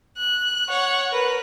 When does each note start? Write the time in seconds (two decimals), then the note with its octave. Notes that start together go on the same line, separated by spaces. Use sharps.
0.17 F#6
0.69 C#5 F#5
1.12 A#4 B4